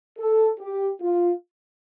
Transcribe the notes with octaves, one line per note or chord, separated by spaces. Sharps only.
A4
G4
F4